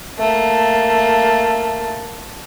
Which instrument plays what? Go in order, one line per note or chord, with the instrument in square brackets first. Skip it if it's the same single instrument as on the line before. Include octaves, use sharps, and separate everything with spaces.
[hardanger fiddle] A3 A#3